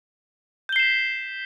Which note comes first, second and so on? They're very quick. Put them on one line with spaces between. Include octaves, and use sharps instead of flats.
G6 G7 C7 E7 B6